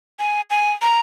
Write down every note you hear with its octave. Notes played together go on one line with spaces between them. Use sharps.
G#5
G#5
A#5